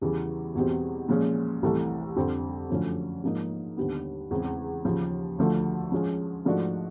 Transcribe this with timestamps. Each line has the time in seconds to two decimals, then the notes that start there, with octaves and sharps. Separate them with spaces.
0.02 E2 C#3 E3 G3
0.55 E2 B2 G3 C4
1.09 A#2 F3 G#3 C#4
1.63 C2 C3 E3 A3
2.16 F2 D3 G3 C4
2.70 F#2 D3 F3 A3 C#4
3.23 G#2 F3 A#3 D#4
3.77 D#2 D3 G3 B3
4.31 E2 C#3 E3 G#3 C4
4.84 D#2 C#3 F3
5.38 D2 D3 F3 A3
5.92 F3 G#3 C#4
6.45 G#2 F3 A3 D4 F#4